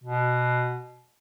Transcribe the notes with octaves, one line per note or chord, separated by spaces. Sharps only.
B2